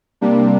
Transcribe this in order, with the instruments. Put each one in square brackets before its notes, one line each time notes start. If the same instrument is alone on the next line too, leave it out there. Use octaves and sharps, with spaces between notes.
[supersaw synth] C3 G3 A#3 D4